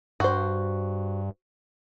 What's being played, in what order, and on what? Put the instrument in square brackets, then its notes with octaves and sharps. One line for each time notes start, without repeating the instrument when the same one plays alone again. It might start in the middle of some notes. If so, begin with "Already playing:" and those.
[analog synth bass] G2 [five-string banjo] F#4 C5